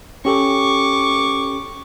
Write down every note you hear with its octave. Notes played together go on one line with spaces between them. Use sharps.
C#4 G4 A4 C#6 D6